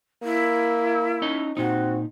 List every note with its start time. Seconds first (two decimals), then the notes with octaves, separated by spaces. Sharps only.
0.23 A#3 E4
1.22 C#4 D#4 D#5
1.57 A#2 C4 D#4 F#4